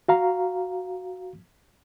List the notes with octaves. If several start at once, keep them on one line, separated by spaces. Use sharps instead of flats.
F#4 F5 A#5